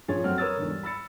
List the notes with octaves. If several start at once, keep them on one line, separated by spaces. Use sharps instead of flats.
A#2 F3 C#4 G#4 C#5 A6
F#2 A3 C4 F#5 F6
A#4 B4 C#5 D#6 E6 A6
E2 G#2 D3
G3
B5 E6 A6 C#7